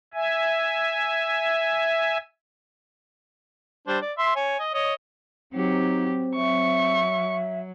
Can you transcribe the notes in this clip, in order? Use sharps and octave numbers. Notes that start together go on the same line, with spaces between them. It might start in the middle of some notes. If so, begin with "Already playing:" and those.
E5 G#5
G3 D4 C5
D5
E5 C6
C#5 G#5
D#5
C#5 D#5
F#3 C4 D#4 G4
F#3 E5 C#6